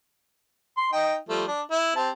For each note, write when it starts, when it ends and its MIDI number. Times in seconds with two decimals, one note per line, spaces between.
0.77 0.90 84
0.92 1.15 63
0.92 1.15 75
0.92 1.15 79
1.29 1.45 53
1.29 1.45 55
1.29 1.45 57
1.48 1.62 62
1.71 1.94 64
1.96 2.10 60
1.96 2.10 67
1.96 2.10 81